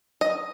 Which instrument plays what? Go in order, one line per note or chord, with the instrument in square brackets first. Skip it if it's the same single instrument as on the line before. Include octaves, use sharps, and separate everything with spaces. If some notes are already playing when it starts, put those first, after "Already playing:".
[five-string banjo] D#5